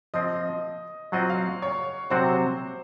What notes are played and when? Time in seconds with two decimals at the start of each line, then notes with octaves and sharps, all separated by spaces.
0.14 F3 C4 F4 D#5
1.12 F#3 C4 F4 C5 D#5 F#5
1.29 F5
1.62 C#5
2.10 C3 F#3 C4 F#4 C5